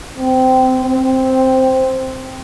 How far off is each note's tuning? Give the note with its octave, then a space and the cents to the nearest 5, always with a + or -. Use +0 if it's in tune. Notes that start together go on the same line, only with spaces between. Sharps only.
C4 -20
C4 +0